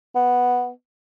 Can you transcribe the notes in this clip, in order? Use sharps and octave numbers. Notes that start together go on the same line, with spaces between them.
B3